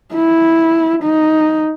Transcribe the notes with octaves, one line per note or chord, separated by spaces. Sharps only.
E4
D#4